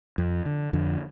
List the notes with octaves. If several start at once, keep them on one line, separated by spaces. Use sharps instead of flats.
F2
D3
F2 D3